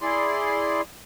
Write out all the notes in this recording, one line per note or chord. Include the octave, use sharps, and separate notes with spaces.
E4 G#4 D5 C6